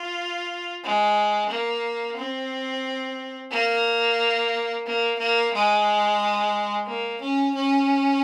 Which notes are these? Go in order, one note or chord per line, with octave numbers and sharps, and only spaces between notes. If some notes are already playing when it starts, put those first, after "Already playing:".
Already playing: F4
G#3
A#3
C4
A#3
A#3
A#3
G#3
A#3
C#4
C#4